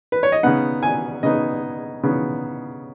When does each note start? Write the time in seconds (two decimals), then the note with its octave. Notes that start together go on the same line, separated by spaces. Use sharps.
0.12 B4
0.23 C#5
0.32 D#5
0.43 C#3 B3 D#4 F#5
0.83 G#5
1.23 C#3 B3 D#4 D#5
2.03 C#3 B3 D#4